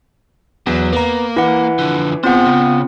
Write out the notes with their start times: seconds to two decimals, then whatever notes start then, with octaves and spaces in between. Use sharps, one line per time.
0.67 E2 F#3
0.93 A#3 B3 A#5
1.36 E3 E4 F#5
1.79 D3 F3
2.24 B3 C4 F4 G#4 C5 F#5
2.44 C#3